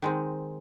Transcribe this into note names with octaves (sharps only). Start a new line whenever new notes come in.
D#3 G#3 C4